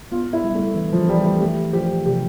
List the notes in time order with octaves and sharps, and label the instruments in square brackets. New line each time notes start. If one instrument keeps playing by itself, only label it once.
[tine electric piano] B3 [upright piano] F4
[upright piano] E4
[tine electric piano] G3
[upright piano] A3
[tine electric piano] E3
[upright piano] F3
[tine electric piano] E3 [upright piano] G3
[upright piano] A3
[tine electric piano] A3 [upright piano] G4
[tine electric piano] F3 [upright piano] G4
[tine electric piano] C3 [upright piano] G4